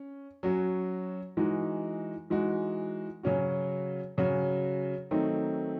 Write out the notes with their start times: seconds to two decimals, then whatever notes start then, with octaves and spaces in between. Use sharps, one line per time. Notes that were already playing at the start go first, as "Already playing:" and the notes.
Already playing: C#4
0.43 F#3 C#4 F#4
1.37 E3 G#3 D#4 F#4
2.30 E3 G#3 D#4 F#4
3.23 C#3 F#3 C#4 F#4
4.17 C#3 F#3 C#4 F#4
5.11 D#3 F#3 A3 C4 D#4